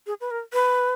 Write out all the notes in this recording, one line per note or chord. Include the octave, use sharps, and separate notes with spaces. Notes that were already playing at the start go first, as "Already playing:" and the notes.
G#4
B4
A#4
B4